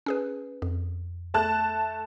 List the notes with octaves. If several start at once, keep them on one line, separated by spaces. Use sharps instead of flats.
C#4 G#4 B4
F2
A3 A5 F#6